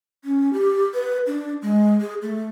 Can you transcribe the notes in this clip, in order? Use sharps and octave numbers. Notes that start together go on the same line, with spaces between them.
C#4
G4
B4
D4
G#3
G#4
A3